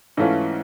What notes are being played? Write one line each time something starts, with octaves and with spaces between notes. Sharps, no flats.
G#2 E3 A3 C#4 F4